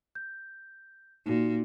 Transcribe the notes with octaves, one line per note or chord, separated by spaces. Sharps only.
G6
A#2 D#4 F#4